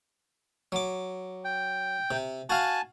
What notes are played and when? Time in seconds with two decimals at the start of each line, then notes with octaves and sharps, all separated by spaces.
0.72 F#3 D6
1.45 G5
2.11 C3
2.50 F#4 F5 G#5 A5